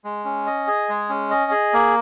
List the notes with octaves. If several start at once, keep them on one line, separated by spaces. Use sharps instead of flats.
G#3
C#4
D#5
G#4
G#3
C#4
D#5
G#4
A#3